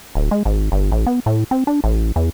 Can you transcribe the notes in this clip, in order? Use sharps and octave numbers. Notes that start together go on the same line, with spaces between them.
D1
G#3
G#1
G1
A1
B3
A2
C4
D4
A1
E2